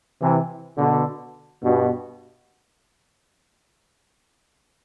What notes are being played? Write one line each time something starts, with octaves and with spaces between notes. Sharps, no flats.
C3 E3
B2 D3
G2 B2